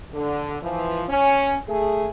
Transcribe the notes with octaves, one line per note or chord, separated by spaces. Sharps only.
D3
E3 F3
C#4
A3 G#4